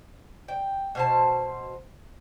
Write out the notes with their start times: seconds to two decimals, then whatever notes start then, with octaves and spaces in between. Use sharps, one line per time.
0.48 G5
0.95 B2 C5 A5